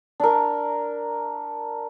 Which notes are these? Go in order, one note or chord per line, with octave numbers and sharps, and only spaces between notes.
D4 A#4